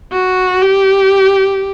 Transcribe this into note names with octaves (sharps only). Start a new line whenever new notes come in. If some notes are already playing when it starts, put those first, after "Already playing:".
F#4
G4